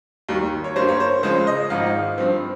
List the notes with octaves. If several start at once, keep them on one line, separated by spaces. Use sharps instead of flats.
D#2 D#3 G3
C#5
G1 G2 G3 A#3 C5
C#5
C5
C#2 C#3 F3 G#3 C5
D#5
G#1 G#2 F3 F5
G2 F3 C4